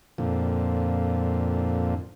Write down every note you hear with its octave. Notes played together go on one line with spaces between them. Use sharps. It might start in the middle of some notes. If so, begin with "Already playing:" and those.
F2 A#2 D3